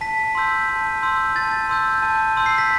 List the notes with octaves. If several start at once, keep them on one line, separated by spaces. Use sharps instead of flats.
A5 B6
C6 E6 G6
A5
C6 E6 G6
A5 A6
C6 E6 G6
A5
C6 E6 G6
C7
B6